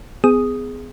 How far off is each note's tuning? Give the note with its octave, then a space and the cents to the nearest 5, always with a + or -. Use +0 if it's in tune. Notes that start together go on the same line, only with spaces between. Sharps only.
B3 +35 G#4 -5 D#6 +0